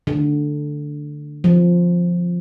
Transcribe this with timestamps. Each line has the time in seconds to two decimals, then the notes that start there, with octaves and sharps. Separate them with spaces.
0.07 D3
1.44 F3